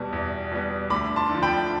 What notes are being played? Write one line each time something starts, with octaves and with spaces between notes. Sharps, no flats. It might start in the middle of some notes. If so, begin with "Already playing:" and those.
Already playing: E2 B2 G3 B3 A5
E2
B2 G3 B3
D2 B5 D6
A5 C6
D3
F3
G5 B5